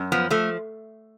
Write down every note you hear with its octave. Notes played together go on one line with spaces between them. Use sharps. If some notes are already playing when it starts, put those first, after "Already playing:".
Already playing: F#2
F3 B3
F3 A3